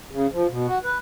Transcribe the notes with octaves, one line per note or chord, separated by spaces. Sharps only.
C#3
F3
B2
F#4
B4